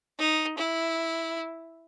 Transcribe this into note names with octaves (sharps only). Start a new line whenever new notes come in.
D#4
E4